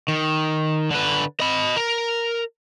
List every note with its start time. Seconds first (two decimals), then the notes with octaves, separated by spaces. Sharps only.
0.08 D#3
0.91 D3 B4
1.40 D#5 B5
1.76 A#4